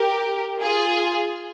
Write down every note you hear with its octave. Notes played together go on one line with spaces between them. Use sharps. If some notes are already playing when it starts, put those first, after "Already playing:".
Already playing: G4 A#4
F4 G#4